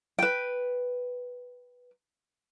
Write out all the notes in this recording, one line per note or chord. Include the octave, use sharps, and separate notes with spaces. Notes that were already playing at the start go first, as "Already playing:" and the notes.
B4 G5